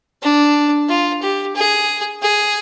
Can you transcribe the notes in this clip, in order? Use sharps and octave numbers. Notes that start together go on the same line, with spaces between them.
D4
F4
G4
G#4
G#4